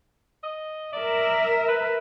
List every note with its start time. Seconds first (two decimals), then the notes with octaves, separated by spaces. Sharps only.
0.43 D#5
0.93 A#4 D5 E5
1.68 B4